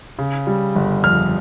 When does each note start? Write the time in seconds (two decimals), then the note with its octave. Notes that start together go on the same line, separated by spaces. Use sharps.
0.19 C#3
0.47 G3
0.75 G1
1.04 F2 F6